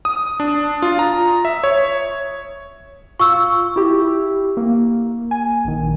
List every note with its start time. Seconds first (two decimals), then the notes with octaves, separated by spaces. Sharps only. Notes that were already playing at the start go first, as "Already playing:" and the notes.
0.05 D#6
0.40 D4
0.82 F4
0.99 A#5
1.45 E5
1.64 C#5
3.20 F4 C#6 E6
3.76 E4 G4
4.57 A#3
5.31 G#5
5.65 A#1 D#3